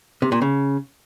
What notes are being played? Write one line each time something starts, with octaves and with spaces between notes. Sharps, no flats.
C3
A#2
C#3